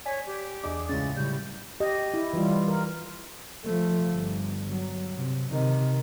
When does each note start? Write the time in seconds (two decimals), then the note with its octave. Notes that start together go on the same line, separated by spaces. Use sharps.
0.05 C#5 D5 G#5 B6
0.26 G4
0.64 E2 D4 G#4 D#5 D6
0.89 C#2 A2 G#3 C#4 A6
1.16 A2 C#3 F#3 G3 G6
1.80 G4 D#5
2.14 E4
2.33 E3 G3 F4
2.68 A#4
3.65 F3 A3
4.09 G1
4.69 F#3
5.16 C3
5.49 C3 D#3